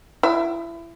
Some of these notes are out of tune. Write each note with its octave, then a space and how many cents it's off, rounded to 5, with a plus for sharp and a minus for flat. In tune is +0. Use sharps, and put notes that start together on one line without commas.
E4 +30